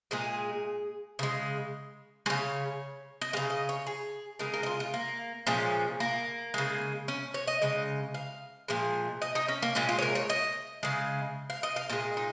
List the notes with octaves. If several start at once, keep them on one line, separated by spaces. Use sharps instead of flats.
A#2 G#3 G#4
C#3 G#3
C#3 G#3 C#5
D#5
C#3 G#3 F5
D#5
C#5
G#4
C#3 G#3 A#4
A#4
D#4
F4
F4
A#3
A#2 F3 G#3 C#4
A#3
C#3 G#3
C#4
C#5
D#5
C#3 G#3 D#5
F5
A#2 F3 G#3
D#5
D#4
C#4
A#3
A#2 G#3 C#4
F4
C#5
A#4
C#5
D#5
C#3 G#3
F5
D#5
F5
A#2 G#3 D#5
D#4